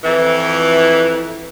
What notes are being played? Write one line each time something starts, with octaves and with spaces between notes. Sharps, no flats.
F2 E3